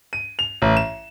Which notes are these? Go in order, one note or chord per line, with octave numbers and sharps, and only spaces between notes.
D#7
F7
A1
E7